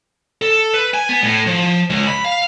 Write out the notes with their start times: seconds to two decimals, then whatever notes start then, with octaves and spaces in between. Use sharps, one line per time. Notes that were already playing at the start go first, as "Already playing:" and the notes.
0.42 A4
0.74 B4
0.94 G#5
1.09 B3
1.23 A2
1.47 F3
1.90 C#2
2.07 B5
2.24 F5